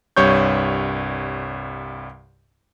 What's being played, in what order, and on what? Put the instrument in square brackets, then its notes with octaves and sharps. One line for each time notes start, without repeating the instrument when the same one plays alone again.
[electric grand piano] C2 G2 C#5 C#6 G6